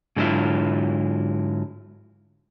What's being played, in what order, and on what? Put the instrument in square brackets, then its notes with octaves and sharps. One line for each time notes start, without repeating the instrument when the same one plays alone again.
[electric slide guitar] G#2 D3 F#3 C#4 E4 F4